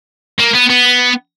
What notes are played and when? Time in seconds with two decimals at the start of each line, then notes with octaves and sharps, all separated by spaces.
0.40 A#3
0.55 B3
0.70 B3